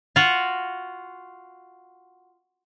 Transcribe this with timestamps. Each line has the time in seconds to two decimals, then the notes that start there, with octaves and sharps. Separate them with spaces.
0.16 F4 F#4